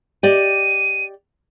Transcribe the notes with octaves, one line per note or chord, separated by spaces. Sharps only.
G4 D5 D#5 D#7